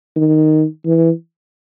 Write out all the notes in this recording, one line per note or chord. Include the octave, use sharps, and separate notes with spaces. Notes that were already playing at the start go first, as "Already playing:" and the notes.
D#3
E3